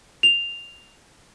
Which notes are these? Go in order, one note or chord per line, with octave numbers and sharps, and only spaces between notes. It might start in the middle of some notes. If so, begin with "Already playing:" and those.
F7